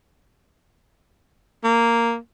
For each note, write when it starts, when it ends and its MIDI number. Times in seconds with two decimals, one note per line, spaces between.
1.64 2.17 58